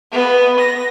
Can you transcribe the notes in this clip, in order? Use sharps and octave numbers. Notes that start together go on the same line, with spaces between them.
B3
A#6